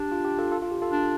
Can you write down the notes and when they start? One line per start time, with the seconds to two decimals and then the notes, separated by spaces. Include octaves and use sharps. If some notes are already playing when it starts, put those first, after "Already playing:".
Already playing: D4 G4
0.12 F4
0.25 G4
0.39 F4 A4
0.52 F4 A4
0.62 F4
0.71 G4
0.82 F4 A4
0.91 D4